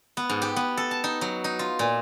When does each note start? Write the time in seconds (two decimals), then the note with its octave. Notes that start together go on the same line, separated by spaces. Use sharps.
0.17 B3
0.30 G#2
0.42 G4
0.56 B3
0.77 A4
0.91 A5
1.04 D#4
1.21 F#3
1.44 D#4
1.59 F4
1.79 A#2